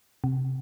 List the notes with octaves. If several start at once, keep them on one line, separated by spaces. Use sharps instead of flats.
C3